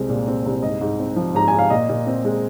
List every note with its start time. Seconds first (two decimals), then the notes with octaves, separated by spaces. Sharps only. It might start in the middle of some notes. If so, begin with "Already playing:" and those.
Already playing: C2 G#3 C4 C5
0.09 A#2
0.28 C4
0.46 C2
0.62 G#2 D#5
0.81 G#2
0.99 C4
1.16 F3
1.34 G#2 A#5
1.48 G#2 G#5
1.59 F5
1.70 A#2 D#5
1.89 A#2
2.07 C4
2.25 G#3